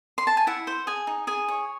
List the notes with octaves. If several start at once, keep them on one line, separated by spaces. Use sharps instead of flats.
C6
A5
G#5
E4 F#5
C5
G#4 G#5
D#4
G#4 G#5
C#5